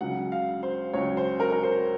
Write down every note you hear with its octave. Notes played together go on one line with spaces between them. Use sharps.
C#2 C#3 F#3 F#5
F5
C5
C#2 C#3 F#3 C#5
C5
A#4
A#4
C5